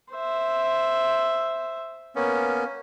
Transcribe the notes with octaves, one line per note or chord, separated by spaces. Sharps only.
C5 E5
A#3 B3 C#4